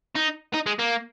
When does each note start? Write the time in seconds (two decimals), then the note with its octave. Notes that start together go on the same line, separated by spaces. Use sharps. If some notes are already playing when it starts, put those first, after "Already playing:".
0.16 D#4
0.54 D#4
0.66 G#3
0.79 A#3